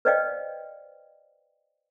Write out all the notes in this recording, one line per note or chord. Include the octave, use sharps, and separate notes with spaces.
B4 C5 D5 D#5 F5 G5